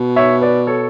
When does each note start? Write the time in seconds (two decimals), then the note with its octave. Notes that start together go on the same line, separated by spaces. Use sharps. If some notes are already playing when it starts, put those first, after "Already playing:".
Already playing: B2
0.16 C#5 E5
0.42 B4 D5
0.67 A4 C#5